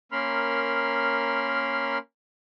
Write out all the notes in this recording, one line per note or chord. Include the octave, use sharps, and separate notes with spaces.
A#3 C#4 A#4 B5 C6 F6